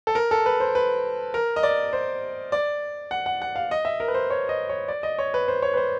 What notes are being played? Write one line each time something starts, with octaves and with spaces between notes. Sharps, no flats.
A4
A#4
A4
B4
C5
B4
A#4
D#5
D5
C5
D5
F#5
F#5
F#5
F5
D#5
E5
A#4
B4
C5
C#5
D#5
C#5
D5
D#5
C#5
B4
C5
C#5
B4
C5